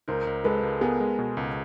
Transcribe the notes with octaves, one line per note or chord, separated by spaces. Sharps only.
C#2 A#4 C5
C#2
G#3 A4 B4
C#2
B3 G#4 A#4
G#3
B2
C#2